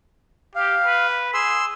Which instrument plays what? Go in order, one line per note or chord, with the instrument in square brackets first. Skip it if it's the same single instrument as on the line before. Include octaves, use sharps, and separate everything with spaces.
[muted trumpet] G4 [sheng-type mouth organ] F5
[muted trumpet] B4
[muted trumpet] G#4 [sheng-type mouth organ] C6 E6